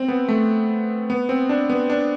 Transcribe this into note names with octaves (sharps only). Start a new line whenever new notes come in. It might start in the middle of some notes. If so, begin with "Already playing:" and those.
Already playing: C4
B3
A3
B3
C4
D4
B3
D4